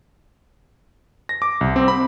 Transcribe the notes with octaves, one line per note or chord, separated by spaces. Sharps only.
A#6
D6
C2
C4
B5